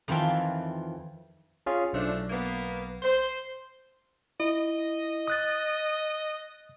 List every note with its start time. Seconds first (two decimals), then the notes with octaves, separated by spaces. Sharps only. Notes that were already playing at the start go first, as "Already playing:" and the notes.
0.08 F2 D#3 E3 F4 E5 G5
1.66 C#4 F4 G#4
1.93 B1 F3 A3 D4
2.30 A#3 B3
3.02 C5
4.40 E4 D#5
5.28 D#6 F#6 A6